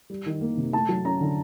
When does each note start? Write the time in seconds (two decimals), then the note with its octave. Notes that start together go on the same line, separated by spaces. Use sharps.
0.10 G3
0.26 D#3
0.41 A#3
0.57 C3
0.73 A3 A5
0.89 F#3
1.05 C#4 A#5
1.21 D3